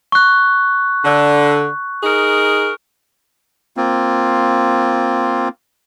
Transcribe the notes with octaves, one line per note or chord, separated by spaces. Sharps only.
C#6 F#6
D3
D#4 G#4 A#4
A#3 C4 F4